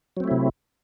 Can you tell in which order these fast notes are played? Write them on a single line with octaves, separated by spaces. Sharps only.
F#3 C4 A3 E4 C3